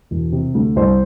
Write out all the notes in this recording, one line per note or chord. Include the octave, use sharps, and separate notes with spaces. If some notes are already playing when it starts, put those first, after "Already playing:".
E1
C3
D2
C2 C5